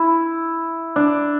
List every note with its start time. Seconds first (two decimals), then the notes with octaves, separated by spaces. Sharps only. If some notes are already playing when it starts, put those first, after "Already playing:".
Already playing: E4
0.96 D4